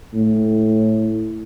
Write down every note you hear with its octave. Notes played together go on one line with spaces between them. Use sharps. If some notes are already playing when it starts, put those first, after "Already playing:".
A2